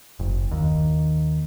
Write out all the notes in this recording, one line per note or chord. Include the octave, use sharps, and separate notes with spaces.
F#1
D#2